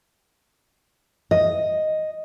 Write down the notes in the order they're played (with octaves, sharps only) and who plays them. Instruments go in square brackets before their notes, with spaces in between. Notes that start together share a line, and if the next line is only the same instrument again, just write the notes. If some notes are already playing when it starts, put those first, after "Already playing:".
[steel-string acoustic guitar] D#5